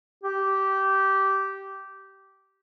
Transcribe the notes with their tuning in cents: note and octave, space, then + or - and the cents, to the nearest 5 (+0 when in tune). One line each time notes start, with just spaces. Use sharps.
G4 -15